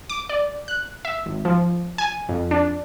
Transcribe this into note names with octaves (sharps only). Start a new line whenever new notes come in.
D6
D5
F#6
E5
G#1
F3
G#5
F2
D4